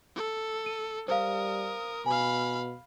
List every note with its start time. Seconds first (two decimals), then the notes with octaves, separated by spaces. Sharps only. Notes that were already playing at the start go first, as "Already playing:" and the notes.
0.16 A4
0.66 D#7
1.08 G3 A#4 C5 F5 D#6
2.06 B2 F5 G#5 B5